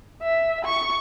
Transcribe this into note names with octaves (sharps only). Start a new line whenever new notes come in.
E5
C#6